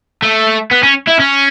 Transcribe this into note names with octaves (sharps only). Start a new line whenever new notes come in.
A3
B3
C#4
E4
C#4